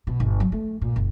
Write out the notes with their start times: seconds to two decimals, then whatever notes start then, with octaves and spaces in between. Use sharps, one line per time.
0.07 B2
0.20 G1
0.40 F#3
0.52 A3
0.82 A#2
0.96 F#1